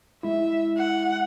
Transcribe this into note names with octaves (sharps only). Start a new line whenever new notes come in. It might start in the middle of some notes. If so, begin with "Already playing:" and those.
G#3 E4 E5
F#5